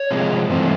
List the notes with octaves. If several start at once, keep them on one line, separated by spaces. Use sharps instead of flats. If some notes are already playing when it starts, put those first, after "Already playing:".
Already playing: C#5
C3 F3 G#3 C4
G2 E3 A3 C4